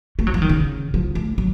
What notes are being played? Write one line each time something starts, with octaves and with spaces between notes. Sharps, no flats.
A3
F#3
F3
D#3
C#3
F3
A3
F#3